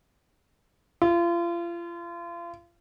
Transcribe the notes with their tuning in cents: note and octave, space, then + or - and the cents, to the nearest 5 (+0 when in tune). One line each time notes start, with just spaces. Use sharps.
F4 -35